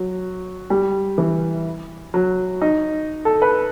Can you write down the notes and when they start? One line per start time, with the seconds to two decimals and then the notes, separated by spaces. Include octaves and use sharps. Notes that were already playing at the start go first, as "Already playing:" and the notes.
Already playing: F#3
0.70 G3
1.18 E3
2.14 F#3
2.61 D#4
3.25 A4
3.42 B4